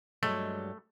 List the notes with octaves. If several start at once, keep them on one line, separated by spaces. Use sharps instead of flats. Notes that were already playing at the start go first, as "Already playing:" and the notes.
G2 F#3 G#3 A3